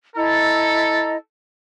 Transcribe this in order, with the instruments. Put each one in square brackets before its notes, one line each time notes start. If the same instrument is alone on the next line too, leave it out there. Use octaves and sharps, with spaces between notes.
[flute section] E4 D#5 A#5 [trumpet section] A4